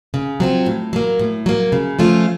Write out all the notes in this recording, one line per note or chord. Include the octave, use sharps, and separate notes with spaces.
C#3
F#3 C4 F4
A2
F#3 A#3
A2
F#3 A#3
C#3
F3 A3 C#4 F4